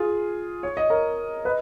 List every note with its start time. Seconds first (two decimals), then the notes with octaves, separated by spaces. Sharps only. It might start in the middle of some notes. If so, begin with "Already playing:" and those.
Already playing: F4 G#4
0.63 C#5
0.77 D#5
0.90 A#4 C#5
1.45 B4 D#5